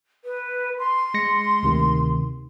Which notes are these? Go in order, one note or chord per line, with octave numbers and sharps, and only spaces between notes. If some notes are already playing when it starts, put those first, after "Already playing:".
B4
C6
G#3 A#6 C#7
D2 C3 D#3